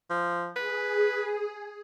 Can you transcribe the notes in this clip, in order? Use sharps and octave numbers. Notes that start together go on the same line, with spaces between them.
F3
G#4 B4